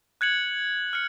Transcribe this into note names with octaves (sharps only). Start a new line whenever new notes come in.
F#6 G#6 C#7 F#7
F6 C#7